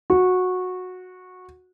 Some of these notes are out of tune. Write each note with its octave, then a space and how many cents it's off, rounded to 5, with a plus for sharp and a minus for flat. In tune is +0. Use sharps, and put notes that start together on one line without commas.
F#4 -15